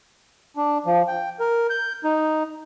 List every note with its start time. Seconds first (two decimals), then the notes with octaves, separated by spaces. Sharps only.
0.57 D4
0.86 F3
1.08 G5
1.40 A#4
1.70 G6
2.04 D#4